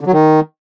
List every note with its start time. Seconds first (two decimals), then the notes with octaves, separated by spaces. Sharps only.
0.01 D3
0.07 F#3
0.13 D#3